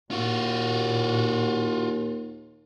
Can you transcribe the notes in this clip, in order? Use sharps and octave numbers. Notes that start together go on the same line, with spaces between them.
D#2 A#2 F4 F#4